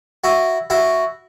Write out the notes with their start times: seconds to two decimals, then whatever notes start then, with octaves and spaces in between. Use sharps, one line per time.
0.24 E4 F#4
0.70 E4 F#4